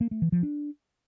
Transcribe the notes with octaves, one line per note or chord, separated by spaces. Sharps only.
A#3
A3
E3
F3
D4